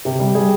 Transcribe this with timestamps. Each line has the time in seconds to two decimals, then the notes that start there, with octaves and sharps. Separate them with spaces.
0.05 C3 G4
0.20 G3
0.35 G3 G#4